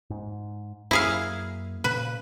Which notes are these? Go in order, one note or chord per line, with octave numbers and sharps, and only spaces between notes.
G#2
F#2 A#3 E4 G#4 F5
A#2 C#3 B4